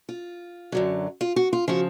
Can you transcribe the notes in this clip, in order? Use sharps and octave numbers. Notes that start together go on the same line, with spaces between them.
F4
F#2 D3 F#3
F4
F#4
F4
C#3 F3 F#4